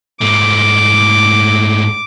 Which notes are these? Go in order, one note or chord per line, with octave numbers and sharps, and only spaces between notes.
G#2 A3 D6